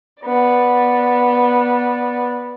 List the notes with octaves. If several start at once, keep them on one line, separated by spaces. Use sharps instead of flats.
B3 D5